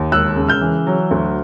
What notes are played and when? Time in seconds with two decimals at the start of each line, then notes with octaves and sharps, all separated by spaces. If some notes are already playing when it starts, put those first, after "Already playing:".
Already playing: D#2
0.12 E1 E6 F#6
0.36 C#3
0.48 F6 G6
0.61 E3
0.87 F#3
1.11 D2